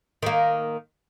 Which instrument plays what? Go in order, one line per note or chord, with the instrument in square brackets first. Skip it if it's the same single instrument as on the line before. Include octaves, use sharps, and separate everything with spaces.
[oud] D#3 A#3